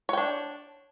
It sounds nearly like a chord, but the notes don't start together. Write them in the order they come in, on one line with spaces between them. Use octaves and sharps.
C#5 G5 D4